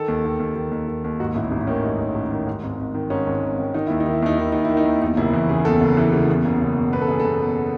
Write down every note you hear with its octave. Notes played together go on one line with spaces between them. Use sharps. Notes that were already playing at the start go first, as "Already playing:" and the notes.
Already playing: D#3 A4
D#2
D#3
D#2
D#3
D#2
D#3
D#2
G#2 F#4
A1 E4
A1 D#4
D#3 C#4
G#2 D#4
A1
A1
D#3
G#2
G#1
G#1
D#3
G#2 C#4
G#1
G#1
D#3
D#3 D#4
D#2 E4
D#4
D#3
E4
D#2 D#4
D#3 E4
D#2 D#4
D#3 E4
D#4
D#2
E2 D#4
F#1 E4
E3
C#3 G#4
E2 A4
F#1
E3
C#3
E2
F#1
F#1
B2
E2 B4
A4
F#1 G#4
F#1 A4
B2